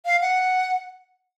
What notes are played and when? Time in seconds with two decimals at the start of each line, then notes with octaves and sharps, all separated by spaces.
0.06 F5
0.21 F#5